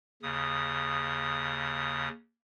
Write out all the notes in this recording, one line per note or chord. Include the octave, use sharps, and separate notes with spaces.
D#2 C#3 D#6